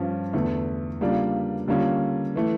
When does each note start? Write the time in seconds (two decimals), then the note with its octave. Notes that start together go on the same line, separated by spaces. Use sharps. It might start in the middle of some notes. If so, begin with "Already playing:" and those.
Already playing: G2 F3 C#4 F4
0.33 E2 D3 A3
1.01 C#3 G3 A#3 D4 F4
1.68 D3 G3 A#3 C#4 F4
2.36 E3 A3